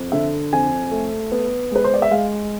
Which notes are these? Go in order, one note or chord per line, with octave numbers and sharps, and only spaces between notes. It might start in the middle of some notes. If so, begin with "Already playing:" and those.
Already playing: F2
D3 E5
F2 G#5
A3
B3
G#3 B4
C5
D5
E5
G#3 F5